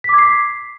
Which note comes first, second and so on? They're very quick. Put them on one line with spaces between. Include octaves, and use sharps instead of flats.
B6 D6 G#6 C7